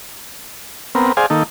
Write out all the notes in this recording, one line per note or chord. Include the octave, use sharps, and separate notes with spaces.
B3 C4 A#4
G#4 C5 D5 F5 G#5
D#3 A#3 D#4 A4